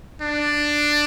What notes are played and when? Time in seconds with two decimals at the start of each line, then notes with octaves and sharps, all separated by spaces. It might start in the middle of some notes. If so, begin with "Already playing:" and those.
0.22 D4